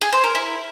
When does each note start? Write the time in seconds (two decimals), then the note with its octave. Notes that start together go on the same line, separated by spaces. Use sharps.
0.01 G#4
0.13 C5
0.24 A#4
0.35 E4